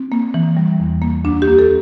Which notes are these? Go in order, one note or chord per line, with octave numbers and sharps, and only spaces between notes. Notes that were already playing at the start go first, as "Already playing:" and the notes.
Already playing: C4
A#3
E3
G3
E2
A#3
D2 D4
G4
A#3
A4